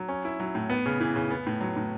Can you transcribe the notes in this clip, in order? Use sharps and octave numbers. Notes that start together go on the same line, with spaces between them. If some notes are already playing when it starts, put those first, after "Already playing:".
Already playing: F#3
C#4
E4
F#3
A2
B3
C#3
E3
C#3
B3
A2
F#3
A2